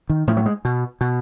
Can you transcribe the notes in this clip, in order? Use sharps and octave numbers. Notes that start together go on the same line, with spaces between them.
D#3
A2 F3
F#3
G#3
B2
B2